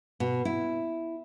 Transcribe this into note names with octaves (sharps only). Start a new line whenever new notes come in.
B2
E4